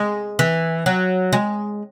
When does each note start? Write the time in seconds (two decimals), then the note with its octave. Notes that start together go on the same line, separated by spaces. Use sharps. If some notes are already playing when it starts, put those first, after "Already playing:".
Already playing: G#3
0.39 E3
0.86 F#3
1.33 G#3